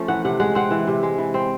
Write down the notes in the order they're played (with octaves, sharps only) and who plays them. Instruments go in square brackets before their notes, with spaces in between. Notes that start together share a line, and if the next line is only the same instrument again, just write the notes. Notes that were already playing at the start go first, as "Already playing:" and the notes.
Already playing: [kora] F3 A3 C#4
E3 F#5
C3 F#5
G#3 F#5
C4 F#5
E3
C3
G#3
E3
C4